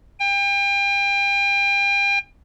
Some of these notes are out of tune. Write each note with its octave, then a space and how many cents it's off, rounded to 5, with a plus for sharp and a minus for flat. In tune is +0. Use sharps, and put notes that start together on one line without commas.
G5 +35